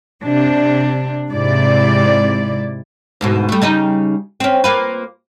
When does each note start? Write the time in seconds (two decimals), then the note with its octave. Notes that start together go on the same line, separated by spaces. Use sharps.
0.23 C3 D4
1.29 G#2 C3 E4 D5
3.21 D2 G#2 B2
3.49 G3 A3
3.62 C#3 G3 D#4
4.40 C4 C#4
4.64 A#3 F4 B4